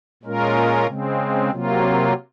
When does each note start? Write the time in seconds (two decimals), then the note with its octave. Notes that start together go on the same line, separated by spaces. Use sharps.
0.23 A#2 G#3 C#4 F4 A#4
0.86 C#3 G#3 C4
1.50 C3 F#3 A#3 F4